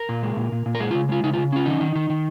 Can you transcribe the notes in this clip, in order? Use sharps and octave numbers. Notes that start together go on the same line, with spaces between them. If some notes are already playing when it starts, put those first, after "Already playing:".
Already playing: A#4
A#2
G#3
A#2
A#2
A#2
A#4
G#3 G#4
C#3 F4
G#3 F4
C#3 D#4
C#3 F4
C#4 F4
D#3 D#4
D#3
D#3
D#3